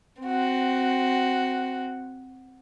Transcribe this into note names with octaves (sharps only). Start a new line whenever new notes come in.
C4 F#4